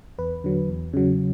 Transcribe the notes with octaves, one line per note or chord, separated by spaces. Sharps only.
E2 B4
D3 F#3
E2
C#3 F#3